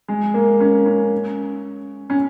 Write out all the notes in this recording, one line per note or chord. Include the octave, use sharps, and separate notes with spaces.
G#3
A#3
C#4
C#4
C#4